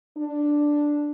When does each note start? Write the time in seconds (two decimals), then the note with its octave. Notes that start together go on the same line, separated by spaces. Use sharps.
0.18 D4